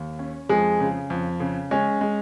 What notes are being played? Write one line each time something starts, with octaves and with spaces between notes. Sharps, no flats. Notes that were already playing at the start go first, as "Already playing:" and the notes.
Already playing: D#2
C#4
F2 G#3
C#3
F2
C#3
G#3 C#4
G#3